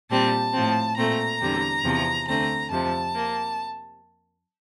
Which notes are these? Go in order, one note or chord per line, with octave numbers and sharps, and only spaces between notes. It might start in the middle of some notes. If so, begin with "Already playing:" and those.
A#2 G3 C4 A5
A2 F3 C4
A#2 A3 C4 A#5
E2 D3 G3 C4
E2 C3 F3 C4
D2 D3 A3 C4 A#5
F2 C3 F3 A5
A#3